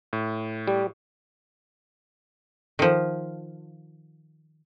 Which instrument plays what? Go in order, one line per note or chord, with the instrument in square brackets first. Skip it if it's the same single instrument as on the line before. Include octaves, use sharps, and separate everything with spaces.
[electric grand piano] A2
[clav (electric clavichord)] G3
[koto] D#3 F3